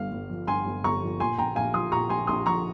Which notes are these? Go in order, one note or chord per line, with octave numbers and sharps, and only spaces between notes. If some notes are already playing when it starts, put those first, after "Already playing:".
Already playing: G1 G2 F5
G1
F3
G2 G#5 C6
G1
G1 A#5 C#6
F3
A#2 G#5 C6
A#1 G5 A#5
A#1 F5 G#5
F3 C6 D#6
A#2 A#5 C#6
A#1 G#5 C6
A#1 C6 D#6
F3 A#5 C#6